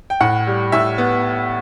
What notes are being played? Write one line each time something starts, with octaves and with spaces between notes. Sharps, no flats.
G5
A2 F#5
G3
A2 E5
B3